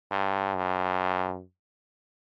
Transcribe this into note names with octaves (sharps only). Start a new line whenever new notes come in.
G2
F#2